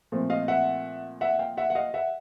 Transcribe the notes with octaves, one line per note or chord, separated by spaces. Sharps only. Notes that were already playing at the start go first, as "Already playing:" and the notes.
A#2 F3 A3 C4
D#5 F5
E5 F#5
E5 F#5
F5 G5
E5 F#5
F#5
D#5 F5
E5 F#5